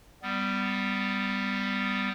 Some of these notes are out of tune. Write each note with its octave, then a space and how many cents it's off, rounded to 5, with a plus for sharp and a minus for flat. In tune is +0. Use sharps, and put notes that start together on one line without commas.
G3 +5 B3 +20